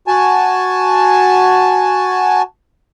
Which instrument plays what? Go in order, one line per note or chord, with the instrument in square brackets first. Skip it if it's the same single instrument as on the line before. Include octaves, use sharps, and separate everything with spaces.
[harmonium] F#4 G#5 A5